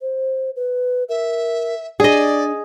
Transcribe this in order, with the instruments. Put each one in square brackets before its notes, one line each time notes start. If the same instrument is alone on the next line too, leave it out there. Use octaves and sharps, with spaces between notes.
[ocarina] C5
B4
[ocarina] A#4 [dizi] E5
[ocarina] D4 [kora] G#4 D#5 [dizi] D5